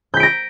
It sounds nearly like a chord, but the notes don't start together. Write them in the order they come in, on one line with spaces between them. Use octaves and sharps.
G6 B6 D7 A#6